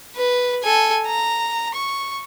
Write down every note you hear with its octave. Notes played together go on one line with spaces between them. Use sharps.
B4
A4 G#5
A#5
C#6